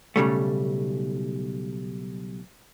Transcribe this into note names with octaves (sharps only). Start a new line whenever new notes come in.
B1 C#3 G3 A3